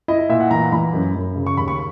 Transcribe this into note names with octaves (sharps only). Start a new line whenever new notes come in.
E4 D#5
D#5
A#2 E5
F#5
E3 A#5
E3 B5
F#2
F#2
C#3
C#6
D#2 B5
C#6